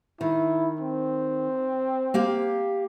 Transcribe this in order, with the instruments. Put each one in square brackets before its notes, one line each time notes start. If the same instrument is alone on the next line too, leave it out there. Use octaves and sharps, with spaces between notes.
[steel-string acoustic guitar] D#3 [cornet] E4
[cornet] C4
[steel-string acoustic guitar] A#3 G4 F5